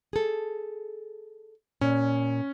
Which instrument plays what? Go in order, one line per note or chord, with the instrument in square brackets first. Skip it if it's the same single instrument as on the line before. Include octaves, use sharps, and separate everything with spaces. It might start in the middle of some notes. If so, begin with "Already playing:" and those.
[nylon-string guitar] G#4 A4
[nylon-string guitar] A#2 [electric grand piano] C#4